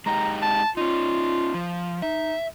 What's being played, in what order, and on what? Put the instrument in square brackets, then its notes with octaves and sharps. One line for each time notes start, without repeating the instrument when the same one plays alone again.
[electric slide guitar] G#3 D#4 G4 [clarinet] A#5
[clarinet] A5
[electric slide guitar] C#4 D#4 [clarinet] F4
[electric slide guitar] F3
[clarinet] D#4 [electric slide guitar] E5